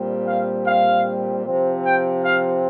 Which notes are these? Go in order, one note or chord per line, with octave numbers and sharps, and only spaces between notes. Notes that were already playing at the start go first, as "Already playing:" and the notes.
Already playing: A#2 G3 C4
F5
F5
C3 F3 C4
G5
F5